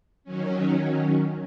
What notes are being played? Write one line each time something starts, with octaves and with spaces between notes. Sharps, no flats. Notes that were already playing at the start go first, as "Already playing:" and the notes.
D#3 F#3 C#4